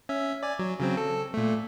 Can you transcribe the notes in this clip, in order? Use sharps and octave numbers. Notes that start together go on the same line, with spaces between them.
C#4 E5
D5 G#5
F#3
C#3 F#3 C4
A4
A#2 A3